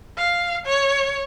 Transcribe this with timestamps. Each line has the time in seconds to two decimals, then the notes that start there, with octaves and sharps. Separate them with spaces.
0.17 F5
0.66 C#5